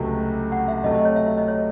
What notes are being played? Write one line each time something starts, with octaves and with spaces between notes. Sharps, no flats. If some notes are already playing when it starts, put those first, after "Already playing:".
Already playing: C#2 C3 F#3 A3
F#5
E5
C3 F#3 A3 D#5
D#5
C#5
E5
E5
D#5
C#5